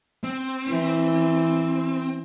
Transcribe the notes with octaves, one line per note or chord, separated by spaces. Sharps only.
C4
E3